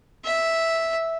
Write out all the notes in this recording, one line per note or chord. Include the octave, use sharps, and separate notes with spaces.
E5